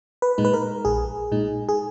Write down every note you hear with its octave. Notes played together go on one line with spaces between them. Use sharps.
B4
A#2 G#3 D#4
B4
A#4
A#1 G#4
A#2 G#3 D#4
G#4